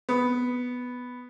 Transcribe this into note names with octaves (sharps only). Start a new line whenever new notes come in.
B3